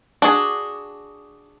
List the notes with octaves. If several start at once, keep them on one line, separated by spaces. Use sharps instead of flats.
D4 F#4 G#4